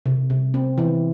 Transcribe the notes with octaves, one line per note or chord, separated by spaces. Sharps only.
C3
C3
C4
E3